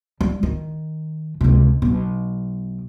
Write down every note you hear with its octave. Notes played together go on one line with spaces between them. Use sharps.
G3
D#3
C#2 C3
B1